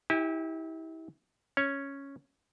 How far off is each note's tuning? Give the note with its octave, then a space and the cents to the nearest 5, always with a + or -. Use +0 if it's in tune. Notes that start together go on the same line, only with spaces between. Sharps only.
E4 -30 G4 +0 G#5 -45
C#4 +0 C#5 +0